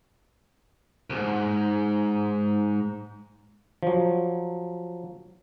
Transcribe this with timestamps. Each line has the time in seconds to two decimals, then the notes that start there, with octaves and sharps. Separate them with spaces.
1.10 C2 G#2
3.83 F3 F#3